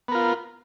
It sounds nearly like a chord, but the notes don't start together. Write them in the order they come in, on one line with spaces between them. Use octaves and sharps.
B3 A#4 F4